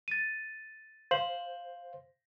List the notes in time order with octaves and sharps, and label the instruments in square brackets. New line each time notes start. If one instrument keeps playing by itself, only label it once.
[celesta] A6 D#7
[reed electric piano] C5 [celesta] F5 F#7